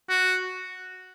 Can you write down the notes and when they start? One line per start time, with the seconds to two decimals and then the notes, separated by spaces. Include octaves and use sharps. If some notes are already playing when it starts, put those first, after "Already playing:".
0.09 F#4